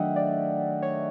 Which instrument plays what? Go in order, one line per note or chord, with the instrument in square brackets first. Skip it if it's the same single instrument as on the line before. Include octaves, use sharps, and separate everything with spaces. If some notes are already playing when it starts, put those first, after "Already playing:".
Already playing: [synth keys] D#3 F#3 A3 D4 D#5 E5 F#5 G5
D5
C#5